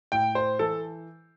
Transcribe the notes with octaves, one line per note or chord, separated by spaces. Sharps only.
A2 G5
C5
E3 A4